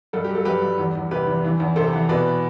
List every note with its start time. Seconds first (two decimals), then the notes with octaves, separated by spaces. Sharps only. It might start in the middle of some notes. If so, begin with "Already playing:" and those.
0.13 G2 A4
0.24 G4
0.29 F#3
0.35 A4
0.45 G2 G4 B4
0.62 G2
0.78 E2
0.95 E2
1.11 C3 G4 B4
1.27 E2
1.44 E3
1.60 E2
1.76 C3 A4 C5
1.93 E3
2.09 B2 B4 D5